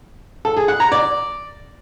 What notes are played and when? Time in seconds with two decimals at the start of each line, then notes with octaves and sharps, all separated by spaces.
0.45 A4
0.57 G#4
0.68 F#5
0.80 A#5
0.92 D5